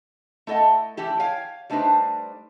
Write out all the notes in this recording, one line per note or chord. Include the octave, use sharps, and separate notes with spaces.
A3 E4 A4 D#5 F#5
E3 A3 E4 G4
C#5 F5 G5 G#5
G3 A3 D4 D#4 B4 C5